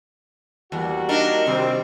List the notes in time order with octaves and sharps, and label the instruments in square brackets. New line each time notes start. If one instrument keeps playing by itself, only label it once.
[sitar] E2 [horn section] G3 A#3 F#4
[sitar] D4 D#4 A#4
[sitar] C3 [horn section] D#3 G3 C4